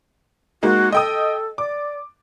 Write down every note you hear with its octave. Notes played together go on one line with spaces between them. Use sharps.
G#3 A#3 D#4 F#4
A4 D#5 G5 D#6
D5 D6